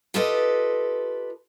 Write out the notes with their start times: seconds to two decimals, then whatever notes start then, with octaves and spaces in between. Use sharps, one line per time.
0.14 F4 G4 A4 B4 D#5